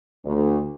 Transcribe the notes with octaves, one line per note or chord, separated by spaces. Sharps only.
D2